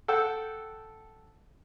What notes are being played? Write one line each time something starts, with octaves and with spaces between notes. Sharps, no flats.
A4 F#5 G5 E6